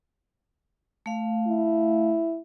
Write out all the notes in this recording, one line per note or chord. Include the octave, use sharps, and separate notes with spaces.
A3 F5
E4